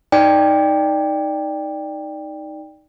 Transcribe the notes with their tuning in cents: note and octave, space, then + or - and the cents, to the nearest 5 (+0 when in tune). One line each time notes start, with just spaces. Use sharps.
D#4 +0 D5 +0 G5 +15